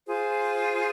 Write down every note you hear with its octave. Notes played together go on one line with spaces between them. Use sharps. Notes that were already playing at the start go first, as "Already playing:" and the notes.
F4 G#4 C5